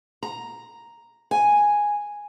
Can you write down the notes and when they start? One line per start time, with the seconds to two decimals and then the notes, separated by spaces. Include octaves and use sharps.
0.23 A#5
1.31 G#5